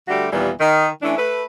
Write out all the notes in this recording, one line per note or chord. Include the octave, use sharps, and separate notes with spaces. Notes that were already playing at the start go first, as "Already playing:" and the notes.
D3 G3 A3 F#4 G4
D#2 A#2 E3 G3 B3
D#3
E3 A3 C#4 D4 E4
A3 B4